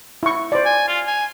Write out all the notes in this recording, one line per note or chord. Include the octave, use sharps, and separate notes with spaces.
E4 C#6
C5 D5
G#5
F4
G#5